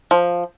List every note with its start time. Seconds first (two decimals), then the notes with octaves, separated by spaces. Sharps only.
0.11 F3